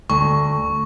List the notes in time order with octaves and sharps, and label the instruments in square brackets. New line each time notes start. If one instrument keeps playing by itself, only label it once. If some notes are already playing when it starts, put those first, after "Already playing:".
[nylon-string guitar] D2 [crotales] C#6